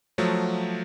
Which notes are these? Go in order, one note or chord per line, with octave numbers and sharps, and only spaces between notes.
F3 F#3 A3